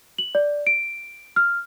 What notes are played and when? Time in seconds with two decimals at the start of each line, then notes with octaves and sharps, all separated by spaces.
0.18 F#7
0.35 D5
0.67 D7
1.36 F6